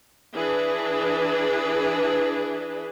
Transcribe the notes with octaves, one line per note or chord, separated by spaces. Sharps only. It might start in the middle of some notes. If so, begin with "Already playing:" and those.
E3 D4 G#4 B4